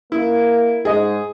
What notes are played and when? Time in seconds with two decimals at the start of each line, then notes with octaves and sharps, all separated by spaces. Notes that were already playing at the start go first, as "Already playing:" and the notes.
0.12 A#3 E4
0.85 G#2 G#4 D#5